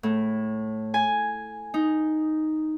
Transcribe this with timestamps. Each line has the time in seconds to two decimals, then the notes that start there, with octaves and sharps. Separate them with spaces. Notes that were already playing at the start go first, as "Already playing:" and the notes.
0.03 A2
0.94 G#5
1.74 D#4